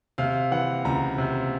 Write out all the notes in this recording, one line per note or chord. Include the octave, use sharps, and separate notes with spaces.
C3 F5
E3 F#5
C#2 A#5
C3